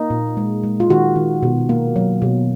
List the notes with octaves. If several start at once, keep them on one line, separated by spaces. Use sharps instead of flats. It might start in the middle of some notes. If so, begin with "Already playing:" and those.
Already playing: A#3 D#4
A#2
G#3
G#3
F4
D#3 F#4
D#3
B2
A#3
F#3
B2